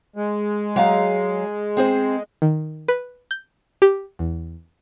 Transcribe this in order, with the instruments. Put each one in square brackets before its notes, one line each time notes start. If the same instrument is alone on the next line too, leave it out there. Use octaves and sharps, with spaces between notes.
[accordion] G#3
[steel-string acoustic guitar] F#3 F5 A#5
C4 G#4 C5
[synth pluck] D#3
B4
G6
G4
E2